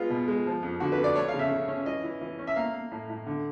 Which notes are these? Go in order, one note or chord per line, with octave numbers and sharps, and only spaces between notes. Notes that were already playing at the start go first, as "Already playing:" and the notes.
Already playing: G#3 B3 F4
B2
G#3
F3
F2
D3 F#4
B4
F2
D5
A3 C#5
F5
C#3
E5
C#3
C#4
E3 D#5
E3
E3
C#4
E5
A#3 F5
A#3
A2
A2
D3